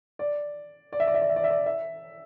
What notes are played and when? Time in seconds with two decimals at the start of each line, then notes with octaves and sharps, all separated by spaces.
0.19 D5
0.93 D5
1.00 E5
1.07 D5
1.14 E5
1.21 D5
1.29 E5
1.36 D5
1.44 E5
1.50 D5
1.66 E5